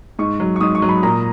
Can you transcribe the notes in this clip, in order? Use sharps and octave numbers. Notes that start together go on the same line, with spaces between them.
G#2 C#6
F#3
C#6
G#2 D#6
C#6
F#3
B5
A#2 A#5